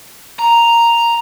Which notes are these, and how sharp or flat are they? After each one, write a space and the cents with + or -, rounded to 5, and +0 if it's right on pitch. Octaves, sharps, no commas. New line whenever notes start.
A#5 +0